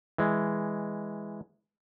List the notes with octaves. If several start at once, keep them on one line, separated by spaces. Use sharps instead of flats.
E3 G#3